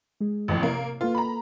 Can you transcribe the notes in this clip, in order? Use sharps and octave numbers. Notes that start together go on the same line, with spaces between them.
G#3 G#4
A1 F2 A2
C3 A#3
A#3 F4 A4 B4
A#5 B5